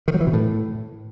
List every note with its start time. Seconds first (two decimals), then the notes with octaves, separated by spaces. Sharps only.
0.08 D#3
0.14 F#3
0.20 E3
0.27 B2
0.33 A2